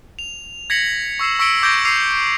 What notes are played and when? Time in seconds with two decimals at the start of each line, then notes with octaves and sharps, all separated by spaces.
0.19 F7
0.70 G#6 A#6 B6 C#7 F#7
1.19 C#6 E6 C7 E7
1.39 C#6 E6 B6 C#7 D7 G7
1.63 D6 G6 G#6 A#6 D7 G7
1.85 D6 E6 C7 D#7 F7